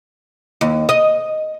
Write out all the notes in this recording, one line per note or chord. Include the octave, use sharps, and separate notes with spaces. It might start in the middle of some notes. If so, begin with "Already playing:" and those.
D#2
D#5